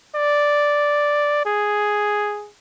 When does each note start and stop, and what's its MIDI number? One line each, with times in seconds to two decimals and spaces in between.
0.16 1.41 74
1.46 2.49 68